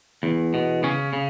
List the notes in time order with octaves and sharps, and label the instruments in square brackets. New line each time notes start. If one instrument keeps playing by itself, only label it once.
[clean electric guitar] E2
B2
C#3 C#4
C#3